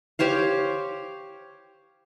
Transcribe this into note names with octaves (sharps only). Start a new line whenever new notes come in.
G4 C5 C#5 F5